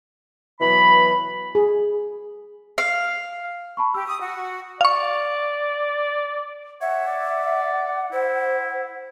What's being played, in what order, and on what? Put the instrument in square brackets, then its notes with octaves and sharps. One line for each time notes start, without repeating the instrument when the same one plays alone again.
[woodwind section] B2 E3 F#3 B5
[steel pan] G#4
[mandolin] F5
[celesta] A5 B5 C#6
[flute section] G4 [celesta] E6
[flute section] D#6
F#4
[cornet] D5 [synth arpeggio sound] F5 C#6
[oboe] C#5 [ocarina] E5 [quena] F#5
[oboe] D5
[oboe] E4 [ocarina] C5